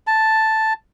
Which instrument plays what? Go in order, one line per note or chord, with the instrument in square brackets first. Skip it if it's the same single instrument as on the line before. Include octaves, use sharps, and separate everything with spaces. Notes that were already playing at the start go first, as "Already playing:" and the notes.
[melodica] A5